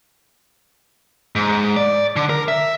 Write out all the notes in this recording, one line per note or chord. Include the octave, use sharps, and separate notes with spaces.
G#2
D5
D3
A#4
E5